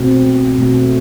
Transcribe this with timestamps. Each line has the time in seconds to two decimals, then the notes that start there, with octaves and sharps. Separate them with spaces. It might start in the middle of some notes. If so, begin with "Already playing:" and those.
Already playing: B2 A3 C4 F#4
0.59 B2 A3 C4 F#4